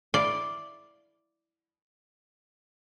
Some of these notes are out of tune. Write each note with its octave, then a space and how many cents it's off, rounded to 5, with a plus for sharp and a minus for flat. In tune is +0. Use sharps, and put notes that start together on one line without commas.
E4 +0 D5 +0 F5 +0